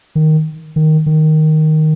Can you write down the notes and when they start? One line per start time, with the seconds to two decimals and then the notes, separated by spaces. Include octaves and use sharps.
0.15 D#3
0.76 D#3
1.06 D#3